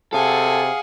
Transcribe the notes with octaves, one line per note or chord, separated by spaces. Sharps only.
C3 G#4 A4 F5 F#5 G#5